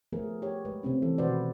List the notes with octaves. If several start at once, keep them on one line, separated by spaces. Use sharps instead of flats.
F3 A3 B3 G#4 A#4
G4 C#5
G#3 B4 C#5
C3 A3 C4 C#4
E3 A4
B2 D#3 F#4 B4 C5 D5